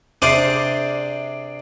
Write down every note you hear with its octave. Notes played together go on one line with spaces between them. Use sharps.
C3 D4 G#4 C5 D5 F5